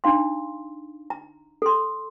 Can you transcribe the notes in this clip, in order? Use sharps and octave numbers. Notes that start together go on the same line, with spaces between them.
D4 D#4 F5 C6
A#5
A4 C6